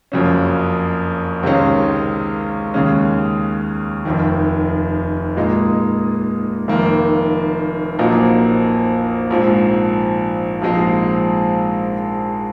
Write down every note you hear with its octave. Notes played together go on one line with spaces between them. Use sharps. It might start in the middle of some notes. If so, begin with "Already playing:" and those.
F#1 F2 C#3 F#3 C#4
C#2 C3 D#3 G#3 C#4
D#2 C#3 G#3 C#4
F1 F2 D#3
A#2 G#3 D#4
F1 F2 D#3 A#3
A#1 A#2 F#3 C4 D#4
A#1 G#2 F3 C4
A#1 G#2 F3 G#3 C4